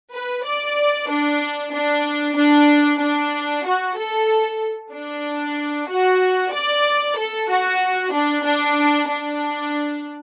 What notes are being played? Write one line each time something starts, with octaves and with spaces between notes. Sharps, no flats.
B4
D5
D4
D4
D4
D4
F#4
A4
D4
F#4
D5
A4
F#4
D4
D4
D4